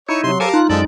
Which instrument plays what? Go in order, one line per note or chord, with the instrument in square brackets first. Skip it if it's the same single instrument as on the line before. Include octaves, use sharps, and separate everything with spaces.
[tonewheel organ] D#4 E4 [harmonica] C#5 [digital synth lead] C#7
[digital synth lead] C3 [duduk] F#3 [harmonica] C6
[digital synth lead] G4 [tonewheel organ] A4 C5 G#5 [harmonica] A#4 F5 A5
[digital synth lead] D#4 [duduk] F4 [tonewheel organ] F#6
[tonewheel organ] F#2 D5 [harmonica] F3 A4 [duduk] G#3